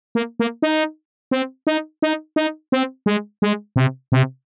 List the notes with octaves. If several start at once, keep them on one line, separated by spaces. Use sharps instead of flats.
A#3
A#3
D#4
C4
D#4
D#4
D#4
C4
G#3
G#3
C3
C3